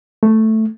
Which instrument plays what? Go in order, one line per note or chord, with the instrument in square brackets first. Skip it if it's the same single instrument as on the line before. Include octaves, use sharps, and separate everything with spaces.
[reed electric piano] A3